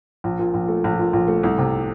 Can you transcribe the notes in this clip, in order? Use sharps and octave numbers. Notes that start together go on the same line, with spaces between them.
A#1
A#2
A#1
A3
A#1
A#2
A#1
A3
C2
C3